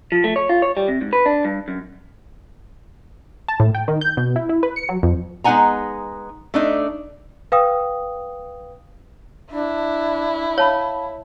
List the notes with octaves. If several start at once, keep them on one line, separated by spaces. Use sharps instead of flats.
F3
A3
C#5
F4
C#5
G3
C3
G#2
B4
D4
G2
F#2
A5
A2
G5
D#3
G6
B2
E4
E4
B4
C#7
F#3
F2
G#3 B3 D#4 F#5 G#5 A#5
A3 D4 D#4
B4 F5 G5 D#6
D4 E4
C#5 F5 A5 B5